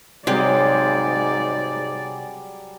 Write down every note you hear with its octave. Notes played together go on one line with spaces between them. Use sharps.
G#2 C3 F#3 G3 G#4 D5